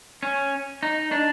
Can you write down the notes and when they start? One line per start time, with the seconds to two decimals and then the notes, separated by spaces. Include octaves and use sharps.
0.23 C#4
0.83 D#4
1.12 D4